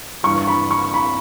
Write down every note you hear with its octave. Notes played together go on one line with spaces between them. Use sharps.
G2 E3 G3 C#6
B5
C#6
B5